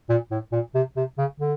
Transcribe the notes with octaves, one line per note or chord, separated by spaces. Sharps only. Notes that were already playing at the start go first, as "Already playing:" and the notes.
A#2
A2
A#2
C3
C3
C#3
D3